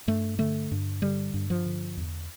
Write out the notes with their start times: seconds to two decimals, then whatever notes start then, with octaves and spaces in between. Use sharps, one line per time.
0.07 G2 A3
0.39 D3 A3
0.72 G2
1.02 D3 G3
1.34 G2
1.50 F3
1.65 D3
1.97 E2